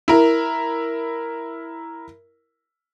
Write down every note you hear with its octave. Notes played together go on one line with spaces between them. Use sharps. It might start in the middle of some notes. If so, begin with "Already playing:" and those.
E4 A#4